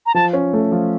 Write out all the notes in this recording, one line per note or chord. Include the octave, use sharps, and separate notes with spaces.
A#5
F3 A5
C#4
A3
F3